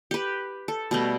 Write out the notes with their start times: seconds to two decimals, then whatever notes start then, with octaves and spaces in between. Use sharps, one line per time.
0.11 G4 B4
0.68 A4
0.91 B2 G3 A3